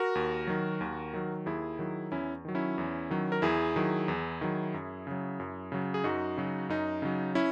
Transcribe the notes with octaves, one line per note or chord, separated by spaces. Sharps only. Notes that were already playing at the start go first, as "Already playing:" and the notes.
Already playing: F#4 A#4
D#2
D#3 F#3
D#2
D#3 F#3
D#2 E4 G#4
D#3 F#3
E2 C#4 E4
D#3 F#3
C#4 E4
E2
D#3 F#3
A#4
E2 E4 G#4
D#3 F#3
E2
D#3 F#3
F#2
C#3 F#3
F#2
C#3 F#3
G#4
F#2 D#4 F#4
C#3 F#3
F#2 D#4
C#3 F#3
C#4 E4